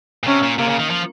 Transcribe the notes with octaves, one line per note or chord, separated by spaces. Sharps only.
A#2
C3 C#4
A#2
C3 A#3
C#3
D#3
F3